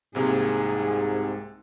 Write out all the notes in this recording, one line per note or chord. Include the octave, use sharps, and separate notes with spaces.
C2 G#2 C3 A#3 G#4